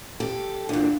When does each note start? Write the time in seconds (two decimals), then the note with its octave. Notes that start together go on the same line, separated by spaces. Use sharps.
0.20 G4 A4
0.69 E2 A#2 D4